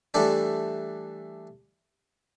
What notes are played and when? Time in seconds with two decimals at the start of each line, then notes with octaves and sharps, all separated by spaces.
0.14 E3 G3 A3 D4 A4 D5